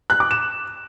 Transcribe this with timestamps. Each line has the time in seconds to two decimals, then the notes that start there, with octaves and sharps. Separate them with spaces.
0.10 F#6
0.20 D6
0.31 E7